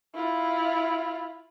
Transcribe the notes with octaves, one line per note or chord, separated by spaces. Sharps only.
E4 F4